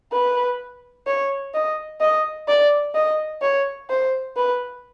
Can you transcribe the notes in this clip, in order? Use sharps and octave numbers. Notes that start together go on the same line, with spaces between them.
B4
C#5
D#5
D#5
D5
D#5
C#5
C5
B4